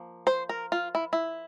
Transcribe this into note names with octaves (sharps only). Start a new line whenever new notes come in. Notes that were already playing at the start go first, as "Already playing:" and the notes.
Already playing: F3 A#3
C5
A#4
F4
E4
E4